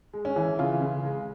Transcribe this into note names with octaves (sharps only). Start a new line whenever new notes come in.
G#3
C#4
E3
C#3 F4
C#3
G#3